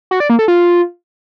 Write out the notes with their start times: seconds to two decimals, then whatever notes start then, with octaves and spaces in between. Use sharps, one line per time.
0.11 F#4
0.20 D5
0.30 A#3
0.39 A4
0.48 F4